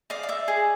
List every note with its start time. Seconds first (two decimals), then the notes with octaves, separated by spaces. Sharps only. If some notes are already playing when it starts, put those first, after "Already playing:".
0.10 D5 D#5 F5
0.23 F5
0.29 D5 E5
0.48 G#4 D#5